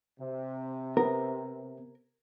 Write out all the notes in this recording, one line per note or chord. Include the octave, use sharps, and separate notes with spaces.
C3
B3 A#4